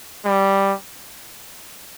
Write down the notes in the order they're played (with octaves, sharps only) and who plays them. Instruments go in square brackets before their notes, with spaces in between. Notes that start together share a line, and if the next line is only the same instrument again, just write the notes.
[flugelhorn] G3